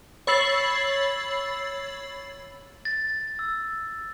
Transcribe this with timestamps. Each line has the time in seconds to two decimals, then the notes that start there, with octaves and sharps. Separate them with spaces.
0.27 C#5 B5 E6 A6 C7 F#7
2.85 A6
3.39 E6